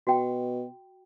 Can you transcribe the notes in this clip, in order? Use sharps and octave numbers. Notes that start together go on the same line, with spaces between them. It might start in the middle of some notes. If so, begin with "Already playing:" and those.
B2 F#4 G5